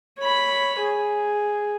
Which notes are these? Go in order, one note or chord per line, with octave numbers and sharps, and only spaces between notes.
C#5 B5
G#4